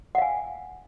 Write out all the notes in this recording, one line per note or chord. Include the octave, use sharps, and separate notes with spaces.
F5 F#5 G#5